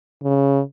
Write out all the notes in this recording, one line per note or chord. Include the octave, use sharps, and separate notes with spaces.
C#3